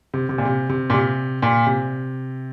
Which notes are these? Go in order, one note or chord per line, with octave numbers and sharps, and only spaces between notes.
C3
C3
A#2
C3
C3
A#2
C3
A#2
C3